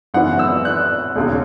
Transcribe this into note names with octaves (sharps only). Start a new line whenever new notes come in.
G#1 F#2 C#3 E3 B3 F#5
E6
F#6
E1 D#2 C#3